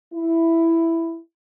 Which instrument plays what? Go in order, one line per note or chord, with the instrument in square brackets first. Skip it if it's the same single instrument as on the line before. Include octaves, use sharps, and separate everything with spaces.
[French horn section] E4